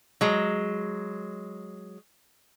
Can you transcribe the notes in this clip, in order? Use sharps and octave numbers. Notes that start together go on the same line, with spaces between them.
F#3 G#3